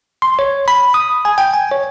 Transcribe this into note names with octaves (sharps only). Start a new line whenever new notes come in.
C6
C#5
B5
D#6
G#5
G5
G#5
C#5